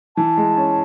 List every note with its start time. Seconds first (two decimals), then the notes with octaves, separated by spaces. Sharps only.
0.16 E3 A5
0.38 G#3
0.57 C#4